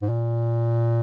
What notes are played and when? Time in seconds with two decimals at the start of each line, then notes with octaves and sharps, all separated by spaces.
0.02 G#2
0.09 A#2